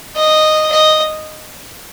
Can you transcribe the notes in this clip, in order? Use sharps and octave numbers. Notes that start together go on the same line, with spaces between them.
D#5
D#5